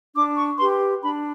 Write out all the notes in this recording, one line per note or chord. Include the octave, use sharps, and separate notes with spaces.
D4 D6
C#6
G4 B4 C6
D4 B5